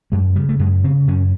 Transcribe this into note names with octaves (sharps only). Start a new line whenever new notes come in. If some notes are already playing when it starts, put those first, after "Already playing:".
F#2 G#3
C#3 G3
A3
F#2 G#3
C#3 C4
F#2 C#4